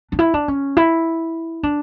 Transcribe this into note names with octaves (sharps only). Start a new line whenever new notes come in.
D4
E4
D4
C#4
E4
D4